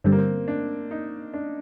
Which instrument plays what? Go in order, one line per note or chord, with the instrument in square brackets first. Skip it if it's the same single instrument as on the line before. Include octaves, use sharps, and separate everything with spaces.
[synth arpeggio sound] G2 D3 G3 [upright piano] C4
[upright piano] A#3
C4
D4
D#4
D4